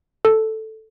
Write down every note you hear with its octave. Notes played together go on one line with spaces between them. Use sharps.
A4